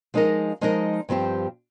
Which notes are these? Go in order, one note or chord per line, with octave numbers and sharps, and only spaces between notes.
F3 G#3 D#4 A#4 D#5
F3 G#3 D#4 A#4 D#5
G2 F3 C4 G4